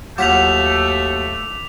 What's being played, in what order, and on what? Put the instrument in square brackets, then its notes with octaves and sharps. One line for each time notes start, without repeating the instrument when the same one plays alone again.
[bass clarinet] D#2 [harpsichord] F#3 F4 F#5 [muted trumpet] A3 [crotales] D6 B6 F7